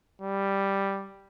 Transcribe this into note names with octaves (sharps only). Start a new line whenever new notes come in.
G3